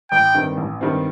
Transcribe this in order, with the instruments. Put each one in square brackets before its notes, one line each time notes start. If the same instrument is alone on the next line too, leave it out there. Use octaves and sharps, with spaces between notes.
[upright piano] A1 [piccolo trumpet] G5
[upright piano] G2 D#3 G3 C4
A1
G2 D#3 G3 C4